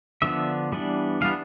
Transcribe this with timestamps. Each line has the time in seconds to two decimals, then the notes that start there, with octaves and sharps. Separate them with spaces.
0.22 D3 F3 B3 D4 E5
0.72 E3 G3 B3 D4
1.21 E3 G3 B3 D4 F5